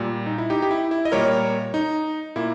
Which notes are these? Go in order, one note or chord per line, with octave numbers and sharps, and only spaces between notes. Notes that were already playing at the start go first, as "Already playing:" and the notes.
Already playing: A#2 G3 A#3
D#4
E4
D#4 G4
G4
E4
E4
D#5
A#2 G3 A#3 A#4 C#5
D#4
A#2 A#3 E4